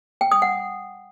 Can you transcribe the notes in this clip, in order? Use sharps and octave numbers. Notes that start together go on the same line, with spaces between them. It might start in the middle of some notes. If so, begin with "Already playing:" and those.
G5
D#6
F#5